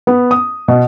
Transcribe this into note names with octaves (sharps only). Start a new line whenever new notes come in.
B3
D#6
B2